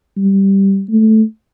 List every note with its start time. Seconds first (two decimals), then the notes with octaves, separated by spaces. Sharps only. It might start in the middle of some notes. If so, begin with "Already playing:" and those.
0.17 G3
0.90 A3